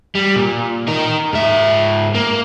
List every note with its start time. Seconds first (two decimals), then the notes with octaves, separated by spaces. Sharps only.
0.15 G3
0.36 A#2
0.87 D#4 A#4
1.33 G#2 E5
2.15 A#3